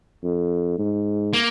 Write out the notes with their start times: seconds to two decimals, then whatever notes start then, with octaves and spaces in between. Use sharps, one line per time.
0.24 F2
0.79 G#2
1.34 A#3